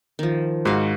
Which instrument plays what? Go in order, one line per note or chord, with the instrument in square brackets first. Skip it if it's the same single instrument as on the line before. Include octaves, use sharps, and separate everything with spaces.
[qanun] D#3 F3
[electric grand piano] G#2 [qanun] F#4 F5